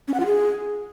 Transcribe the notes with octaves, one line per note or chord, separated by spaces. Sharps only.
C#4
F#5
F4
G#4